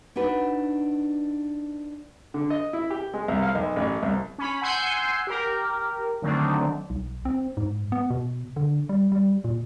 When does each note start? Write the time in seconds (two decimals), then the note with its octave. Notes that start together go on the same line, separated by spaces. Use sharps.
0.16 D4 D#4 F#4 B4
2.34 D3
2.50 D#5
2.73 E4
2.90 G4
3.14 G#3
3.28 C2
3.42 F5
3.55 B1
3.76 A1
4.03 C2
4.38 C#4 B5
4.62 F#5 G#5 C6 E6 G6 C7
5.27 G4 A#4
6.22 D3 D#3 F#3 A3 C4 D4
6.90 B1
7.25 C4
7.57 G#2
7.92 B3
8.10 B2
8.56 D3
8.89 G3
9.12 G3
9.44 A#2